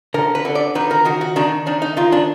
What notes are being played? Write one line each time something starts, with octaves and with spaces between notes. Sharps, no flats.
D3 A#4
B4
D3
D5
D#3 B4
A#4
D#3 F#4
F#4
D#3 D4
D#3 D4
D#4
D#3 F4
D4